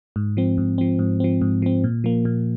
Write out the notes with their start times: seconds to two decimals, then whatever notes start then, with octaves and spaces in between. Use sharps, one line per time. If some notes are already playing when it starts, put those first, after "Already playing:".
0.16 G#2
0.37 F3 C4
0.58 G#2
0.78 F3 C4
0.99 G#2
1.20 F3 C4
1.42 G#2
1.62 F3 C4
1.84 A#2
2.04 F3 A#3
2.25 A#2